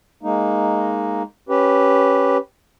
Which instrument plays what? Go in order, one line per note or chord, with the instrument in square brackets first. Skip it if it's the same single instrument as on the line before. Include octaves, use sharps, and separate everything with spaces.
[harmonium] G#3 A#3 D#4
C#4 G4 B4